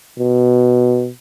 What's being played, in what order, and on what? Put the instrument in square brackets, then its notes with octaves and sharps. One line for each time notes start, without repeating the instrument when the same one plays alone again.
[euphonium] B2